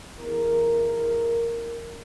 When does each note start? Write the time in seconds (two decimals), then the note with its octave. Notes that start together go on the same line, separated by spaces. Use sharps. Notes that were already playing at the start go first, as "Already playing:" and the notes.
0.18 E2 A#4